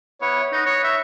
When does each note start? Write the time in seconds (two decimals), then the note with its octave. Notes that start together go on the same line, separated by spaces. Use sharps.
0.21 B3 E4 B4 C#5
0.52 D#4 B4 D#5
0.66 C#5
0.84 E5